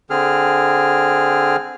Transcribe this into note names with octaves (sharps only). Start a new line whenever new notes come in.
D3 C4 G#4 F6